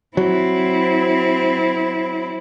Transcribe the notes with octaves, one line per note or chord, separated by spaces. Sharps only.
F#3 C4 E4